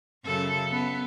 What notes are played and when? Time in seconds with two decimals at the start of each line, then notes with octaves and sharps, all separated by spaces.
0.25 F#2 C#3 A4
0.71 B3